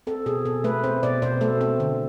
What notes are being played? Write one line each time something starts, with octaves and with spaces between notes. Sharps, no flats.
C4 A4
B2 G#4
B2 A4
A3 B4
C4 C5
B2 D5
B2 C5
A3 A4
C4
D3